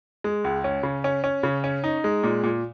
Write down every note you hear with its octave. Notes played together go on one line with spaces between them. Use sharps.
G#3
C#2
C#4
C#3
C#4
C#4
C#3
C#4
D#4
G#3
A#2
A#2